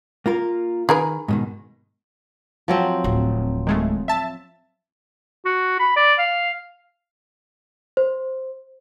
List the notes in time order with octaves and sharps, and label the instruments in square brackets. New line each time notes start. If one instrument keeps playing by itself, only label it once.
[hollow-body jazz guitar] A#3 F4 A#4
[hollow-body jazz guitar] D#3 [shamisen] G#4 A#4 B4
[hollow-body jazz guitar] G#2 B2 D#3
[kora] F3 F#3 C4
[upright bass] D1
[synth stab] D#3 G#3 A3
E5 A5
[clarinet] F#4
B5
D5
F5
[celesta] C5